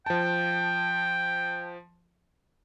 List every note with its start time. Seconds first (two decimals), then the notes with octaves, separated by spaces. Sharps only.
0.06 F3 G5 A5